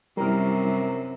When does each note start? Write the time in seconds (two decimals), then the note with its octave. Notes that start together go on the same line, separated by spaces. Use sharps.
0.17 F#2 C3 G3 E4 A#4